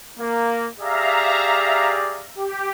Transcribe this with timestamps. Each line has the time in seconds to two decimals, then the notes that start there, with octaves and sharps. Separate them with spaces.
0.18 A#3
0.79 G4 G#4 D5 E5 F5 A#5
2.35 G4